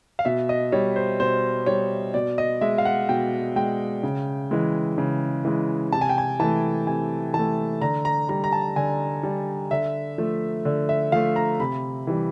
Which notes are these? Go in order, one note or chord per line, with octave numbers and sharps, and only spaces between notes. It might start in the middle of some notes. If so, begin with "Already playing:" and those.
F5
B2 E5
D#5
G3 C#5
C5
B2 C5
G3 C#5
B2 D5
D#5
G#3 E5
F5
F#5
B2 G5
G#3 G5
C#3
E3 G#3
C#3
E3 G#3
C3 A5
G#5
G5
G#5
E3 A3 A5
C3 G#5
E3 A5
A3
D3 A#5
A#5
G3 A#5
A#5
A5
D3 G#5
G3
D3 E5
F3 A3
D3
E5
F3 A3 F5
A#5
C3 B5
E3 G3